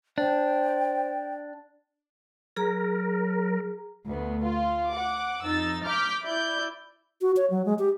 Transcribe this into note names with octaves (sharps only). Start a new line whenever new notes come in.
D4 C5 G5
F#3 G#4 A#4 A#5
D2 B3
F4
F#5 D6
F2 D#4 E6 A6
D6 F6 G6 B6
E4 D5 G6
F#4
C#5
F#3
G#3
G4